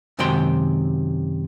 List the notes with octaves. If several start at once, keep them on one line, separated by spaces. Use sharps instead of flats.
F#2 C3 D#3 G#3 G5 C6